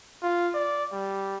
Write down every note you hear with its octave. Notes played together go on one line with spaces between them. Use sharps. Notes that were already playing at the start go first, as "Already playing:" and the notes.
F4
D5
G3